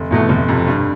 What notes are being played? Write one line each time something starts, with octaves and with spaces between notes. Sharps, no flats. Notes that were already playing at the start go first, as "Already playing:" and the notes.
Already playing: F1
E2 B2 A3
F1
F2 C3
G2